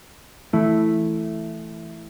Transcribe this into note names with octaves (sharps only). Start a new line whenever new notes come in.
E3 A3 E4